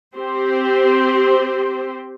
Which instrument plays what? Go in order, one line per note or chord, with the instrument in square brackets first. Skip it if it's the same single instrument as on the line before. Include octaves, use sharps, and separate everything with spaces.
[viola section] C4 G4 C5